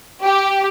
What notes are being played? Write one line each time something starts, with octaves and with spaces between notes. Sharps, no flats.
G4